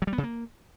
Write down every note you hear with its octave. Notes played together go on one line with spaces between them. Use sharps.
F#3
G3
B3
C#3
A#3